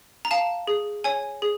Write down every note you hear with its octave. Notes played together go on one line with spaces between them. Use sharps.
A#5
F5 A5
G#4
C#5 G#5
G#4